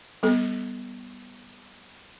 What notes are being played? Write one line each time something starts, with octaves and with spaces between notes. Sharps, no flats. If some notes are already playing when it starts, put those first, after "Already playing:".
G3 B3 A4